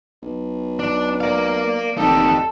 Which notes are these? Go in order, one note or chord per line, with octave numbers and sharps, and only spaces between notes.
B1
D4
A#4 D5 F5
F1 D#4 G4 A4